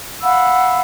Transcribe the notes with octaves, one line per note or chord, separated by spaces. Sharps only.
F5 F#5 B5 E6